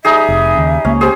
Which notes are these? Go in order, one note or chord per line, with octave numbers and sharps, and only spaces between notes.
G3 D#4 G#4 E5
F1
D#2 C#3
C#2 A#3 C#4
G4 G#4 C5